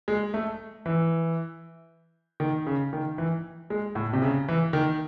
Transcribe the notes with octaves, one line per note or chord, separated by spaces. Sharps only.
G#3
A3
E3
D#3
C#3
D#3
E3
G#3
A2
C3
C#3
E3
D#3